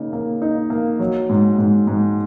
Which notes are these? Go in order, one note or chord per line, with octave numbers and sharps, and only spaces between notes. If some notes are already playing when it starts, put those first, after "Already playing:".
Already playing: C#3 A#3 D#4
A#3
D#4
A#3
F#3
G#2
G#2
G#2